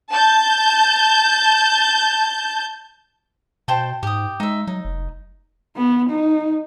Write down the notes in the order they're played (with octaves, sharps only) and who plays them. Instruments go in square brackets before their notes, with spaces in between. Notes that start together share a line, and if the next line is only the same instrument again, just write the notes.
[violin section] A5 G6
[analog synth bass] B2 [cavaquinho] C5 G5 A5
[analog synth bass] G#2 [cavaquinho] G4 D#6
[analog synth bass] G#3 [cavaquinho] D#4 E5
[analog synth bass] F#3 [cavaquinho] D#4
[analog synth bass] F1
[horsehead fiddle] B3
D#4